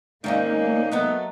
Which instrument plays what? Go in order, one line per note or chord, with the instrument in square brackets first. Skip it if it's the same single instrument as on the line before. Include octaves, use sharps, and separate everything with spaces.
[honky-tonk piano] G#2 D5 F5 [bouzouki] D#3 C4 C#4 [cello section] A#3 [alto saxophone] D#4
[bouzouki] F#3 A3 D#4 [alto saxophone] B3